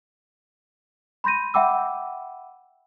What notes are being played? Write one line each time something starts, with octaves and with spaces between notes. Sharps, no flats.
B5 C6 G6 A#6 D#7
E5 F#5 G5 B5 D6 E6